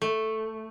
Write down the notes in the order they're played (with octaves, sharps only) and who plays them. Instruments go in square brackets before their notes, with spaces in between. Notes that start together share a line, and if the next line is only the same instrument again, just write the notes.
[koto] A3